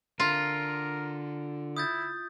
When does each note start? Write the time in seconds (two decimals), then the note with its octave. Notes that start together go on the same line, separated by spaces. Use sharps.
0.20 D3 F4 A#4
1.77 E4 D#6 G6 A6